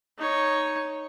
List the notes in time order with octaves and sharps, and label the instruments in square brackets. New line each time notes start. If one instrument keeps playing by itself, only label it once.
[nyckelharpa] D#4 C#5